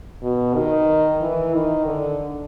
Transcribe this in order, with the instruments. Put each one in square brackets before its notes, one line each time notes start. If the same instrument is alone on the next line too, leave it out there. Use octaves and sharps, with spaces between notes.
[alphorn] B2
D#3
E3
D#3
D3